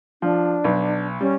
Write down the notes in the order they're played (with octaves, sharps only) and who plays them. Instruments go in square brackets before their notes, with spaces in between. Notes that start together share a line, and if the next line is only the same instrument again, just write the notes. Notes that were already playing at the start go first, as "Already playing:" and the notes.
[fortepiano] F3 [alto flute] D4
[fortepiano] B1
[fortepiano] G3 [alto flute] C#4